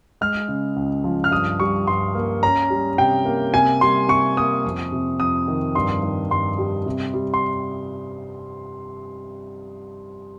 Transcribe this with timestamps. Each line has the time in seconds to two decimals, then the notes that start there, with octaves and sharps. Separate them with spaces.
0.21 G#3 F6
0.48 C#3
0.76 C#2
1.04 F3
1.24 F6
1.31 G2 D#6
1.60 G3 C#6
1.87 G2 C6
2.15 A#3
2.43 C#4 A#5
2.70 G3
2.98 C3 G5
3.25 A#3
3.54 C3 G#5
3.81 G3 C6
4.08 C3 C#6
4.37 A#3 D#6
4.65 F2
4.92 C3
5.20 F2 D#6
5.48 D#3
5.75 G2 C6
6.03 D#3
6.30 G2 C6
6.58 G3
6.86 C3
7.14 G3
7.34 C6